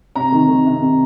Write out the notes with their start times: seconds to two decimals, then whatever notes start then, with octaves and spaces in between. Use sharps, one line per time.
0.15 C3 A#5
0.32 D#3
0.49 D#3
0.66 C3
0.83 C3